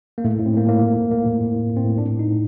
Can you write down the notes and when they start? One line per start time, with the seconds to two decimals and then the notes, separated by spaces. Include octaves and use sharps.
0.18 A#3
0.24 A2 A3
0.39 A2
0.46 C4
0.54 A2 A#3
0.68 A2 A#3
0.83 A2
0.97 A2
1.11 A2 A#3
1.26 A2
1.40 A2
1.55 A2
1.69 A2
1.76 C4
1.84 A2
1.98 A2 D4
2.12 A2
2.19 D#4
2.27 A2